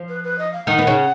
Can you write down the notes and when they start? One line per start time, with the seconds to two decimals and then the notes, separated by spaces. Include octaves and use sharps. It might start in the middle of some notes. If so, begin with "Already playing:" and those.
Already playing: F3 F4
0.09 B4
0.24 B4
0.39 D#5
0.53 F5
0.67 D#3 D#4 F#5
0.78 B3
0.87 C#3 C#4